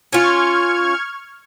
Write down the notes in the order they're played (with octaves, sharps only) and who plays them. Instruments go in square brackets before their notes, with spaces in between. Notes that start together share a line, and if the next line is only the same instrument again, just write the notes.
[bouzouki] C#4 F4 [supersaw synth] C#6 F6 G#6